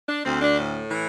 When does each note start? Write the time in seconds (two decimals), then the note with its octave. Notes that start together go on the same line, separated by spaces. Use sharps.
0.08 D4
0.25 D2 C4
0.42 D4
0.58 A2
0.90 E3